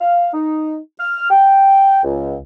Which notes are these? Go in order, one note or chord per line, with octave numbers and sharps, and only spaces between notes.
F5
D#4
F6
G5
C#2